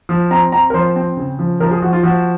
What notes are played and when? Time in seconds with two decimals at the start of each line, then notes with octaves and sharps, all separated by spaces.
0.09 F3
0.31 C4 A#5
0.52 C4 A#5
0.70 A#4
0.74 F3 C5
0.96 C4
1.17 C#3
1.39 F3
1.60 F3 A#4
1.71 G#4
1.82 F3 F#4
1.93 F4
2.03 F3 F#4